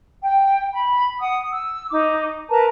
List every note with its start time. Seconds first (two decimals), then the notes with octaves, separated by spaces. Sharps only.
0.22 G5
0.75 B5
1.20 F#5 D#6
1.52 E6
1.90 D#4 D6
2.49 A#4 B4 A5 A#5